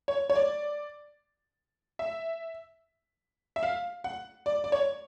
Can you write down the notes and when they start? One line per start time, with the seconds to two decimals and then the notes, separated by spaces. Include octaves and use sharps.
0.08 C#5
0.30 C#5
0.36 D5
1.99 E5
3.56 E5
3.63 F5
4.04 F#5
4.46 D5
4.64 D5
4.72 C#5